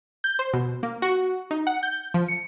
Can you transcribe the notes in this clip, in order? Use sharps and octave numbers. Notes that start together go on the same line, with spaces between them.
G6
C5
B2
A#3
F#4
D#4
F#5
G6
F3
C#7